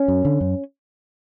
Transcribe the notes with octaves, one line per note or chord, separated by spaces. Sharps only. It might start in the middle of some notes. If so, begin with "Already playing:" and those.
Already playing: C#4
F#2
D3
F#2